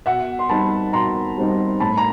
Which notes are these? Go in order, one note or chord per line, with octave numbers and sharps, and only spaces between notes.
B2 E5 F#5
C6
G3 C4 D#4 A5 B5
B2 A#5 C6
G3 C4 D#4
A2 A5 B5
A#5